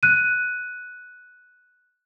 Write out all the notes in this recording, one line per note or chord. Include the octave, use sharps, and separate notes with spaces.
F#6 D#7